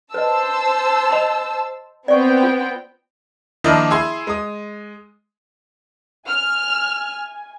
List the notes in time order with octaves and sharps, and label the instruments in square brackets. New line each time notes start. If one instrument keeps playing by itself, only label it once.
[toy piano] B4 D#5 [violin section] C5 A5 E6
[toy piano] D#5 B5 C6
[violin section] B3 C4 G5 [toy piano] D5 C#6
[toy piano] F4
[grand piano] D#3 F3 A#3 D4 E4 D#5
E4 G#4 G#5 C6
G#3 D#6
[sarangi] G#5 [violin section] F6